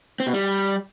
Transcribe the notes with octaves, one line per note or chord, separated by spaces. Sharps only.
C4
B2
G3